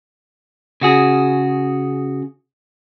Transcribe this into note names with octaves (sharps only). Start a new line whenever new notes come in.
C#3 F#4 G#4